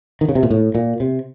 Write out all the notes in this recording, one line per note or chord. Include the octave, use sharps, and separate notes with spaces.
D#3
C#3
C3
A#2
A2
A#2
C3